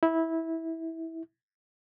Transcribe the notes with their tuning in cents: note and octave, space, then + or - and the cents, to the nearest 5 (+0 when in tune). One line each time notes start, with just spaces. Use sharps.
E4 -15